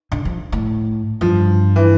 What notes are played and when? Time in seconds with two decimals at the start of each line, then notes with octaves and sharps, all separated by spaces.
0.12 D3
0.25 F3
0.52 A2
1.21 G2 F3
1.76 E3